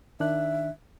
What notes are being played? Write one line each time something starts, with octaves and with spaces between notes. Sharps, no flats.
D#3 D4 E5 F#6